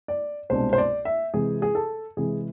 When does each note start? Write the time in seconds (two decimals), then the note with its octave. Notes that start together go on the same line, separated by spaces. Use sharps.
0.08 D5
0.50 C2 B2 G#3 D4 C5
0.73 C5
0.78 D5
1.05 E5
1.34 C3 E3 G#3 G#4
1.62 G#4
1.75 A4
2.17 C3 E3 G#3 G#4